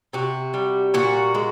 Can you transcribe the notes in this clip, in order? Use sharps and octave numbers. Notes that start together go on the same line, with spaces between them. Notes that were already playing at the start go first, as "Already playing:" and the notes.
C3 F#4
G3
A#2 F#4
G#3